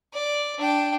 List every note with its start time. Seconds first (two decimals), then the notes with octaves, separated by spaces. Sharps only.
0.13 D5
0.58 D4 G5